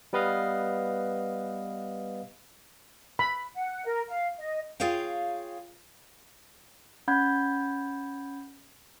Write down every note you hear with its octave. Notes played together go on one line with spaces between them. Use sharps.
G3 B3 B4 D#5 F5
B5
F#5
A#4
F5
D#5
F4 G#4 C#5 F5 G5
C#4 F#5 B5 G6 G#6